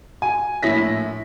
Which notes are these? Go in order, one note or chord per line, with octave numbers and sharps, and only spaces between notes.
G#5
A#1 A2 E4 C#5 A#6 B6